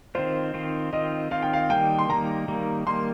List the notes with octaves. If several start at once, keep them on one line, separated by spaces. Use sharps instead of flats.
D#3 C4 F4 C5
D#3 C4 F4
D#3 C4 F4 D#5
D#3 C4 F4 F5
G5
F5
D#3 G3 A#3 G5
C6
D#3 G3 A#3 A#5
D#3 G3 A#3
D#3 G3 A#3 C6